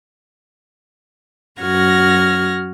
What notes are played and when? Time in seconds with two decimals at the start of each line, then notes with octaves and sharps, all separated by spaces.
1.61 F#2 F#4 F6 G#6 A#6